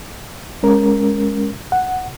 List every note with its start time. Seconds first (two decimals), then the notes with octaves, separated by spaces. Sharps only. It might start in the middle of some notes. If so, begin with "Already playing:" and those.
0.63 G#3 C#4 A#4
1.72 F#5